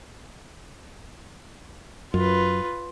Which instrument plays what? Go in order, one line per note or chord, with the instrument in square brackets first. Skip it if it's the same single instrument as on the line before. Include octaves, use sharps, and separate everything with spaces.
[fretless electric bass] F#2 [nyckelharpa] F4 B4